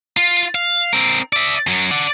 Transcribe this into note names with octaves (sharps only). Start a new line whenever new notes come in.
F4
F5
C4 A#4
D5 E5
F#2 F#3
D5 F#5